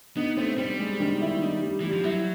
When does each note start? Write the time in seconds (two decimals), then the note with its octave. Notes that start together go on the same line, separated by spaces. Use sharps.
0.17 B3 D#4
0.37 A3 C4
0.58 G3 C4
0.79 G#3
1.00 D#3
1.21 E4
1.42 D#4
1.62 G3
1.80 E3 G3
1.92 F3
2.04 F#3 E4